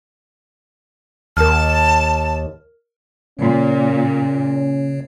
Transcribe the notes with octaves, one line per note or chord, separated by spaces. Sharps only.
D#2 A#4 A5 F6
A#2 C#3 C#4 C#5